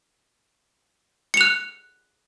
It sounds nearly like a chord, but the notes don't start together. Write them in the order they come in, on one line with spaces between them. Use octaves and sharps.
C#7 F7 F#6